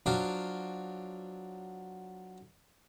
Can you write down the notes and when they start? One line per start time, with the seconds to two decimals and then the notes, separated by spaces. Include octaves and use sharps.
0.06 F3 F#3 D4 F#4 F5 D6